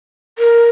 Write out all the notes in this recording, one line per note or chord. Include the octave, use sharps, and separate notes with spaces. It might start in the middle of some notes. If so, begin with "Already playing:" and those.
A#4